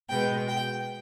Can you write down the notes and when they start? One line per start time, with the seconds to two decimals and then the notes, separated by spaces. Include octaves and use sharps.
0.09 B2 G#3 B3 G5
0.48 G5